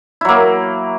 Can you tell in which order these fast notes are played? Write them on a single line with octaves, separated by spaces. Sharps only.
E4 F#3 A#3